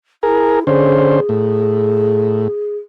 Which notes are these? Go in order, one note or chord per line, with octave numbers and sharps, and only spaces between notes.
E4 G#4 A#4
D3 C#4 G#4 C5
A2